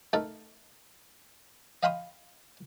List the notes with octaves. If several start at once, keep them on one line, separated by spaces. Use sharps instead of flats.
A3 D#4 A4 A#4
D#5 F5 G5 B5 C6 D#6